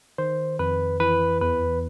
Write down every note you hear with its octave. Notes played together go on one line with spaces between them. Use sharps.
D#3 C5
F2 B4
E3 B4
E2 B4